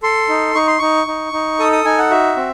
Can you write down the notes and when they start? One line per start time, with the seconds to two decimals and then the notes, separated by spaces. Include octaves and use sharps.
0.03 A4 C6
0.29 D#4
0.55 D#4 C#6
0.67 C6
0.79 D#4 C#6
1.07 D#4
1.33 D#4
1.59 A4 D#6
1.72 D#6
1.85 D#4 G#5
1.98 F#5
2.11 F#4 E5
2.37 C4